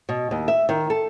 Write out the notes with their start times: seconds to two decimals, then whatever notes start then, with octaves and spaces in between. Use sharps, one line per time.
0.09 B2
0.31 D#2
0.48 E5
0.69 D#3
0.90 A4